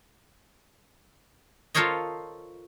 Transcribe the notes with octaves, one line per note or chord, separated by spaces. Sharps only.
F4 A4 A#4 C5 C#5 D#5